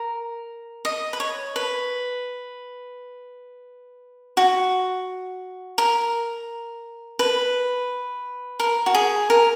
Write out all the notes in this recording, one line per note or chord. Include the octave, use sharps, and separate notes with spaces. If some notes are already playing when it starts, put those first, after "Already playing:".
Already playing: A#4
D#5
B4
C#5
B4
F#4
A#4
B4
A#4
F#4
G#4
A#4